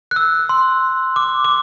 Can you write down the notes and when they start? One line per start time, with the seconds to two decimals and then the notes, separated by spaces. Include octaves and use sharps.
0.11 F#6
0.16 E6
0.49 C6
1.16 D6
1.45 D6